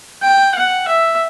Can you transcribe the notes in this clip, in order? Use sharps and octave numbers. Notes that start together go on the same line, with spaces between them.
G5
F#5
E5